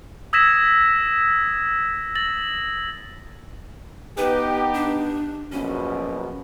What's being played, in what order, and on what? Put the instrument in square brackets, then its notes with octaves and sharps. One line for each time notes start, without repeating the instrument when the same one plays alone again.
[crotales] D#6 E6 G#6 A#6 B6 E7
A6 A#6 F#7
[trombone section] B3 D#4 G4 [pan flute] B4
[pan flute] D4
[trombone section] A#1 F#2 B2 [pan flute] C#4